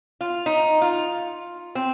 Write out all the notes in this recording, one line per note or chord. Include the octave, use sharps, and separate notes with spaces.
F4
D#4
F4
C4